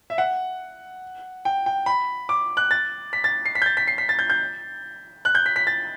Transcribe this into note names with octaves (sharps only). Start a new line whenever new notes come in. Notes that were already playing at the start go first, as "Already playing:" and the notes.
E5
F#5
G5
G5
B5
D6
F#6
A6
B6
A6
C7
B6
G6
A6
B6
C7
B6
A6
G6
G6
F#6
G6
B6
B6
A6